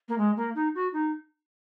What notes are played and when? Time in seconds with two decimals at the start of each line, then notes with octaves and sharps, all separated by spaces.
0.08 A#3
0.18 G#3
0.36 A#3
0.55 D#4
0.75 F#4
0.93 D#4